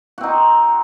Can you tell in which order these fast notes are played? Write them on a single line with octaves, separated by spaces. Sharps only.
F#4 C4 D#4